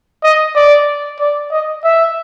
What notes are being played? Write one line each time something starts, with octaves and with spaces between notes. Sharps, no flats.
D#5
D5
D5
D#5
E5